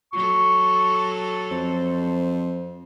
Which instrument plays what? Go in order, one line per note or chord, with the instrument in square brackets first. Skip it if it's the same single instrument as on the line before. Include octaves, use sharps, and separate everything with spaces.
[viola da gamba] F#3 A4 [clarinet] C#6
[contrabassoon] F2 [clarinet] C5